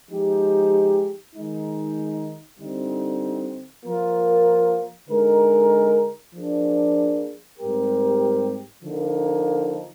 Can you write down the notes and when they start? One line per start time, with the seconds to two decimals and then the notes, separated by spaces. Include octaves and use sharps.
0.10 F3 G#3 D#4 G4
1.36 D#3 G#3 D#4
2.60 D3 G3 C4 D#4
3.85 F3 A#3 F4 A#4
5.09 D3 G#3 D#4 A#4
6.34 F3 A#3 D4 G#4
7.58 G#2 G3 C4 G4 A#4
8.83 D3 F3 A#3 D#4